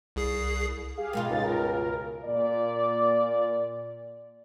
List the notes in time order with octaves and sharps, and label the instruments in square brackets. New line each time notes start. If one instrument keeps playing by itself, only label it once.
[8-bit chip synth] C2 G#4 C7
[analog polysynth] G4 G#4 F5
[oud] G2 B2 F4 [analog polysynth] G#3 A#4
[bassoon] C#2 [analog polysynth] D#4 A6
[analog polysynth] A#4
[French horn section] A#2 D5